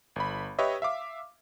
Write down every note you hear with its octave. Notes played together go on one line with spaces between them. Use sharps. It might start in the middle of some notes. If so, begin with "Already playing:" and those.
G1 B5
G4 B4 C#5 D#5 E5
E5 F5 D6